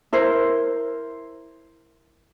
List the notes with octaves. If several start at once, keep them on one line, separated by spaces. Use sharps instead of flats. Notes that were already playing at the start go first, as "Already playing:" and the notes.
E4 A#4 C5